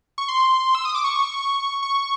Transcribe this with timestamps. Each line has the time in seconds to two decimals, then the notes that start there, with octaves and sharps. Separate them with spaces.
0.18 C#6
0.29 C6
0.75 E6
0.85 D#6
0.95 D6
1.04 C#6
1.82 C#6